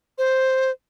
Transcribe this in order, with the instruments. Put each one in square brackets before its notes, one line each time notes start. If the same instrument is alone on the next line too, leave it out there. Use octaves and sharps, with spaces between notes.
[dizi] C5